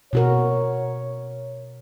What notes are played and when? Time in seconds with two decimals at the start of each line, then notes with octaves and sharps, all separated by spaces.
0.13 B2 F#4 A#4 C#5